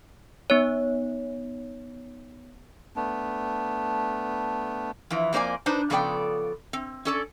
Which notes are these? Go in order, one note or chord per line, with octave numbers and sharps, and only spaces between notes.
B3 D#4 C#5
A3 B3 D4
E3 F3
F2 A#3 C5 D5 G#5
D4 D#4 B4 C5
C#3 F3 B3 A4 D5 G5
C4
C#4 A4 D5